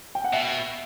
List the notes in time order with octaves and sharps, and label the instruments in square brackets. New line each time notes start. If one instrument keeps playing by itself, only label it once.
[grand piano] G5
F#5
[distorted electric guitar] B2 [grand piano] E5